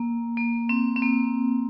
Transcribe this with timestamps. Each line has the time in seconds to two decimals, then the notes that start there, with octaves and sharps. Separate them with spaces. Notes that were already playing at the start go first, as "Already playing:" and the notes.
Already playing: A#3
0.37 A#3
0.69 C4
0.96 C4
1.02 A#3